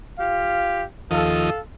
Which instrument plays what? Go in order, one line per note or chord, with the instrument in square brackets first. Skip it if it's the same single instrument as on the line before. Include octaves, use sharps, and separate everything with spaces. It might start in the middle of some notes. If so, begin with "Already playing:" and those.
[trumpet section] F4 G4 F5
[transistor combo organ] D#2 F3 D#5 [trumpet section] A4 F5